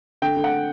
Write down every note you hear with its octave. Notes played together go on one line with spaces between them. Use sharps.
D3 G5
D3
F#5